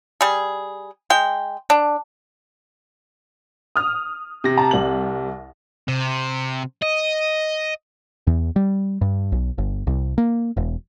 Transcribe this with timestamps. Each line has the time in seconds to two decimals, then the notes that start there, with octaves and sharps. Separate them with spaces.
0.21 G3 G#4
1.10 G#3 G5
1.70 D4
3.76 D#6 F6
4.44 C3 A#6
4.57 A5 A#5
4.71 C2 F#7
5.88 C3
6.82 D#5
8.27 E2
8.56 G3
9.01 G2
9.32 B1
9.58 G1
9.87 C2
10.18 A#3
10.57 E1